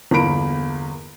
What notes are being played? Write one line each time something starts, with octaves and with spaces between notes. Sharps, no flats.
G1 E2 A#3 B5 D7